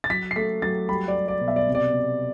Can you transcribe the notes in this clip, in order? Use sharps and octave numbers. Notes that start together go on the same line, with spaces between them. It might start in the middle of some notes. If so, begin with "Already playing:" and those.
A6
F#3 B6
C7
A3 B6
F#3 A6
G3 B5
D5
G3
D5
B2
E5
D5
C3
D5
C3